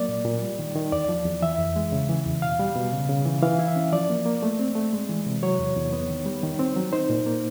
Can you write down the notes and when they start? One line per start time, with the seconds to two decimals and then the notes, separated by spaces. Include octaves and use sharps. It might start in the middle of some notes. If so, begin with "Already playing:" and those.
Already playing: F#3 A#3 D5
0.09 A#2
0.25 A#2
0.42 G3
0.59 D#3
0.76 D#3
0.92 E2 D5
1.09 F3
1.25 E2
1.42 E3 E5
1.59 F2
1.76 G#3
1.92 C#3
2.09 E3
2.25 E2
2.42 B2 F5
2.59 G3
2.76 B2
2.92 C#3
3.09 C#3
3.26 E3
3.42 E3 F5
3.59 E4
3.68 E5
3.76 C#4
3.92 F3 D5
4.10 A#3
4.26 A#3
4.43 A3
4.59 C4
4.75 A3
4.93 G#3
5.09 E3
5.26 C3
5.43 F#3 C#5
5.59 E2
5.76 E2
5.93 B3
6.10 D#3
6.26 G3
6.43 D#3
6.60 C4
6.76 F#3
6.93 D#4 C5
7.10 A#2
7.26 A#3